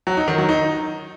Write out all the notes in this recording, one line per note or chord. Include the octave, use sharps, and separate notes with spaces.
F#3
D#4
D#3
F#3
D#4